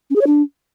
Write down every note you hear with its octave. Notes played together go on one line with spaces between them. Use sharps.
C#4
G#4
C#5
D4